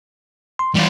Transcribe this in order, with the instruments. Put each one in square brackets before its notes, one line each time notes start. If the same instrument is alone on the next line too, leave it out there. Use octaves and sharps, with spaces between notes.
[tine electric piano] C6
[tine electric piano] E3 [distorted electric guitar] G3 F4